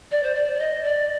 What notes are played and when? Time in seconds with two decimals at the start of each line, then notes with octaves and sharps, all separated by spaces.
0.11 D5
0.23 C5
0.35 D5
0.54 D5
0.59 D#5
0.83 D5